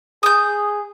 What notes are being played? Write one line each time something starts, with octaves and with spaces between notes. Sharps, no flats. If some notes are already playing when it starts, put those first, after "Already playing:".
G#4 D#6 G6